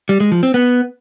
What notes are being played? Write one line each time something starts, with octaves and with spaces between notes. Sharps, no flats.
G3
G#3
F3
C4
B3